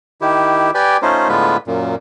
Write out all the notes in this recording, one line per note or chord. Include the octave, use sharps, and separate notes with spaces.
D#3 E4 G4
G4 B4 D5 G5 G#5
A3 C#4 D#4 F4 C5
A2 D3 G#3 B3 F4 B4
F#2 A#2